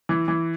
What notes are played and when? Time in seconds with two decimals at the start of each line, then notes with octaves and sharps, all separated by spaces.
0.09 E3
0.28 E3